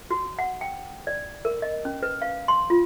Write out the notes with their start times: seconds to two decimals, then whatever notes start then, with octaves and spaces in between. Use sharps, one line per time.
0.11 F#4
0.39 F#5
0.61 G5
1.07 D5
1.45 A#4
1.62 D#5
1.85 C#4
2.03 B4
2.22 F5
2.48 C6
2.70 F4